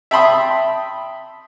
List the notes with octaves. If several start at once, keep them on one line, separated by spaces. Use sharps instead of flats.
E5 G5 A5 B5 C6 D#6